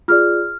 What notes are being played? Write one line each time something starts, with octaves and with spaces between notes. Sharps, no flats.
F4 G#4 D5 F6